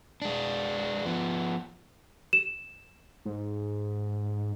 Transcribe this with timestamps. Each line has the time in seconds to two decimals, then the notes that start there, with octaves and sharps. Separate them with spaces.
0.22 G#3 D4
1.05 F3 B3
2.33 E7
3.25 G#2